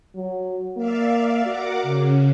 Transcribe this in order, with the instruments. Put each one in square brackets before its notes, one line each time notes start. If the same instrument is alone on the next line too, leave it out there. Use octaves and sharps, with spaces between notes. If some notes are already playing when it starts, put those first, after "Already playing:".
[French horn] F#3
[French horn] A#3 [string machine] D5 E5 F5
[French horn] F#4 [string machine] A#4 F#5 D6
[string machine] C#3